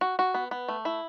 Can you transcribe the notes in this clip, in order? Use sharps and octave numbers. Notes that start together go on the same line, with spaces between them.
F#4
F#4
B3
B3
A3
E4